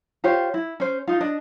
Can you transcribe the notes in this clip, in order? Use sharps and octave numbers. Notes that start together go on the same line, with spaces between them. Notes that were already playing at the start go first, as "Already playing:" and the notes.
F4 G4 C5 C#5
E4
C#4 C5
D#4 F4
D4 D#5